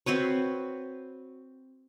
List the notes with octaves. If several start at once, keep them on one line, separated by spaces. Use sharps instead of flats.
C4 F#4 B4 C#5